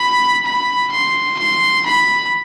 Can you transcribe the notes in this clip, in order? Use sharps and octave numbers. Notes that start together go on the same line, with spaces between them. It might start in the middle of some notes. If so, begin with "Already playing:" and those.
Already playing: B5
B5
C6
C6
B5